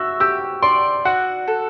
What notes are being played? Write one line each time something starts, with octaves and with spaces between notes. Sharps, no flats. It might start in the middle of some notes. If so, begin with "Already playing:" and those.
Already playing: F#4 E5 E6
G4 E6
D5 C6
F#4 F#5
A4